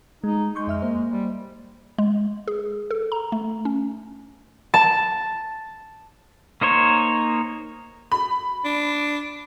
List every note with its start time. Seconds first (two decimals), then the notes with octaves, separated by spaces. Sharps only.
0.24 G#3 D#4
0.55 G#3 C6 C#6 G6
0.67 F2 E5 F6
0.82 A#3 C5
1.12 G3
1.98 G#3
2.48 G#4
2.91 A4
3.12 A#5
3.32 A3
3.65 C#4
4.74 A5
6.61 A#3 D#4 C5 C#5
8.12 B5
8.65 D4